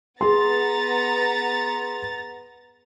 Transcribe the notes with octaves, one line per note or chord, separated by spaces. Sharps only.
B3 G#4 A#5 C6 A6